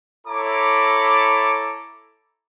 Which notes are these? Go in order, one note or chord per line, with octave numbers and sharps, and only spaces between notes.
E4 A4 C#5 A#5 B5 D6